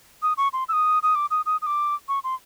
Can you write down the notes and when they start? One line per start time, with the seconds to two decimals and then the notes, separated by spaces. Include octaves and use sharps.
0.22 D#6
0.37 C#6
0.53 C6
0.69 E6
0.73 D#6
1.03 D#6
1.15 D6
1.31 D#6
1.46 D#6
1.62 D#6
1.66 D6
2.08 C#6
2.24 C6